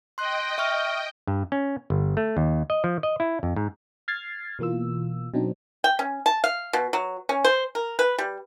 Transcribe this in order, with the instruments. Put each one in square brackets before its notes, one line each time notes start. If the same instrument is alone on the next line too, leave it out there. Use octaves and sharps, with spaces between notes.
[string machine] D#5 G5 [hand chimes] C6 F#6
[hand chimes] E5 C#6 F6
[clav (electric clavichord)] G2
C#4
G1
A3
D#2
D#5
F3
D#5
E4
F2
G#2
[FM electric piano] F6 G#6 A6 C7
B2 E3 A#3 F4 E6
B2 F#3 C4 D4 D#4
[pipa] G5
C#4
A5
F5
B2
F#3
C#4
C5
A#4
B4
G3